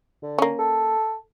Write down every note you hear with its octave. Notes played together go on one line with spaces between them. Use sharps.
D3
A#3 C#4
A4